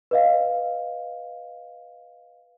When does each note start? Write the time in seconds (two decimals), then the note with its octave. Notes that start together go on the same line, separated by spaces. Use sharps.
0.11 B4 D#5 F5